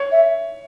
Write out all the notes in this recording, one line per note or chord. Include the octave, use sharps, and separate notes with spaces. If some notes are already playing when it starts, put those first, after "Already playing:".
Already playing: C#5
E5